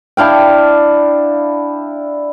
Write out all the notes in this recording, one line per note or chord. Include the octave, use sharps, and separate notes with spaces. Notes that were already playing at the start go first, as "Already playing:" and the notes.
D4 E4 F5 G5